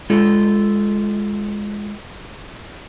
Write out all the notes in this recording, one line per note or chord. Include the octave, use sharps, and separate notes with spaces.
G#3 F4 A4